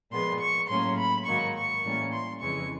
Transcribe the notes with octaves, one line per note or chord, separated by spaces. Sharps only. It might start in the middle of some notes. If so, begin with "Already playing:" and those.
A#2 F3 G#3 B3 C6
C#6
A2 F#3 A#3 C#4 C6
B5
G#2 D#3 F#3 A#3 C#6
C#6
A2 E3 G3 A#3 C#4
C6
F2 C#3 E3 G#3 C#6